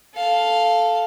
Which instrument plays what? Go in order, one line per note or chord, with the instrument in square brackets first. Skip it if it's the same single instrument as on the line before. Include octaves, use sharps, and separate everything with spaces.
[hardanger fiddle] A4 F5